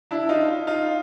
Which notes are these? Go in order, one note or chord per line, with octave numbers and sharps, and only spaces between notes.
D4 E4
D#4 F4
D#4 F4